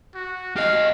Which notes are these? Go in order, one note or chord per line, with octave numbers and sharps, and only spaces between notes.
F#4
G4 D#5 F5